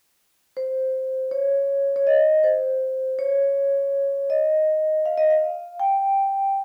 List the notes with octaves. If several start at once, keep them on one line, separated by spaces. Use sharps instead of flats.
C5
C#5
C#5
D#5
C5
C#5
D#5
F5
D#5
F5
G5